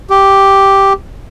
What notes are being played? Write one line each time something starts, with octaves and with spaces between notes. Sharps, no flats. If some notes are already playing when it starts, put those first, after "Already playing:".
G4